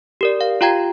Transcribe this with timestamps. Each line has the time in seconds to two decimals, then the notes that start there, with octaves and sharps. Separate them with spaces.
0.21 G4 A#4 D5
0.41 F5
0.61 F4 G4 F5 G5 A#5 G#6